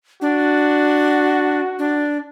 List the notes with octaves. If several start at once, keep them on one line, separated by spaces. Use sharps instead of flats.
D4 F#4
D4